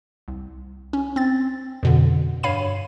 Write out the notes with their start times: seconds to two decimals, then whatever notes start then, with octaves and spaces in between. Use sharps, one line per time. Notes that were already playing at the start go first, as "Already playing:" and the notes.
0.28 C2
0.93 C#4
1.16 C4 A6
1.83 F2 B2 D3
2.43 G2 C#5 F5 B5 D#7